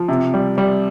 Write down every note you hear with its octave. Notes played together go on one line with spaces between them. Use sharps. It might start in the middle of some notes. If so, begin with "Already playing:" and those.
Already playing: F3
C3
G3
G3